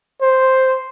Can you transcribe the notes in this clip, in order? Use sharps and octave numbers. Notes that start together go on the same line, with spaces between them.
C5